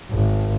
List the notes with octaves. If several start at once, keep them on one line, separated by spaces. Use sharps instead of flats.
G#1